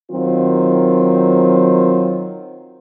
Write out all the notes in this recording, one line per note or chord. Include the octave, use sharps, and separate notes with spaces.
D#3 F#3 C4 F4